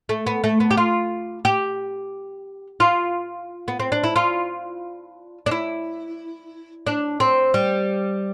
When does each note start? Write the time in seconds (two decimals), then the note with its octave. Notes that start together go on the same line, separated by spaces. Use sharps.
0.09 A3
0.27 B3
0.44 A3
0.60 B3
0.71 G4
0.77 F4
1.45 G4
2.80 F4
3.68 B3
3.80 C4
3.92 D4
4.04 E4
4.16 F4
5.46 D4
5.51 E4
6.87 D4
7.20 C4
7.54 G3